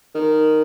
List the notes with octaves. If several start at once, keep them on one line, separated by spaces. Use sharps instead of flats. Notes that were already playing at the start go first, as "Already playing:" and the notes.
D#3